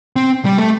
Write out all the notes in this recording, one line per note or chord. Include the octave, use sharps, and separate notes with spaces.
C4
G3
A3